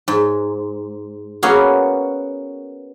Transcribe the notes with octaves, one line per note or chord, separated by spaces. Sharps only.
G#2
A#3 B3 C#4 F#4 G#4